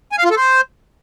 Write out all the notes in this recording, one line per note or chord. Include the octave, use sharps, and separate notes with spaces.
G#5
F5
F4
A4
C5